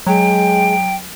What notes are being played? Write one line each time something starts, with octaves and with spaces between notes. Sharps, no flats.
F#3 G#3 G5